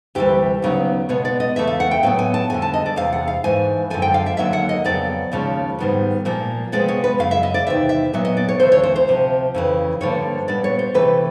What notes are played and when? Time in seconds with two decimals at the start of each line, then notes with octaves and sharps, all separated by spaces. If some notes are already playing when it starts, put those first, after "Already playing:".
0.15 D2 C3 E3 G3 G4
0.62 D#2 C#3 F#3 B3
1.09 B2 G#3 B3 C#5
1.25 D5
1.40 D#5
1.56 E2 C#3 E3 A3 E5
1.67 F5
1.80 F#5
1.91 G5
2.03 A2 F#3 B3 G5
2.19 G#5
2.34 A5
2.50 F2 D3 G3 G#5
2.62 A5
2.74 D#5
2.86 D5
2.96 E2 C3 F5
3.13 F#5
3.28 F5
3.44 G#2 E3 A3 G#5
3.90 F#2 D3 F3 G#5
4.02 G5
4.14 F5
4.26 E5
4.37 D#2 D3 F#3 A#3 E5
4.53 F#5
4.69 D#5
4.85 F2 C#3 F#3 B3 D5
5.32 D#2 C#3 F3 G#3
5.79 G#2 D#3 G3 B3
6.25 A#2 F3 A#3
6.72 C3 F3 G#3 B3 D5
6.88 C#5
7.04 B4
7.19 F#2 C#3 F5
7.31 E5
7.43 D#5
7.54 D5
7.67 E2 C3 D#3 E5
7.89 E5
8.13 A#2 F#3 B3 E5
8.25 D#5
8.37 D5
8.49 C#5
8.60 D2 C#3 E3 C5
8.72 C#5
8.83 C5
8.96 C5
9.08 D2 C3 F3
9.54 F2 C#3 E3
10.01 G2 D3 F3 A#3 C#5
10.48 A#2 G3 B3 D5
10.64 C#5
10.79 C5
10.94 C3 E3 A3 B4